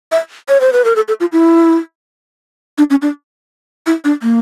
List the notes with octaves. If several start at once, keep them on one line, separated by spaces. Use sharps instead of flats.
E5
C#5
C5
B4
A#4
A4
A4
F4
E4
D4
C#4
D4
E4
D4
A#3